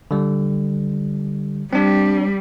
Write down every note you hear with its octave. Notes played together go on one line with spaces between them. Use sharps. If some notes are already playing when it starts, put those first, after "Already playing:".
D3 G3
G3 C4 D4